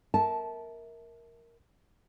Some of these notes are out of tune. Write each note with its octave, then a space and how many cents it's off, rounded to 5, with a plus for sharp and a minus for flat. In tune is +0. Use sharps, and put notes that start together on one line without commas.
A#4 +0 E5 -25 A5 -15